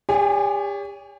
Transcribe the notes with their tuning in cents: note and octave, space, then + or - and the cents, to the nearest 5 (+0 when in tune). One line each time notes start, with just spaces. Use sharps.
G4 +40 C#5 +45 G#5 +0